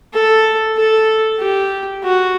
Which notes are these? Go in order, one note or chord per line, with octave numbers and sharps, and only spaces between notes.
A4
A4
G4
F#4